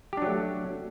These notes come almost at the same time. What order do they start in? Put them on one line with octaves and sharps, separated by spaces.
G4 D4 F#3 A3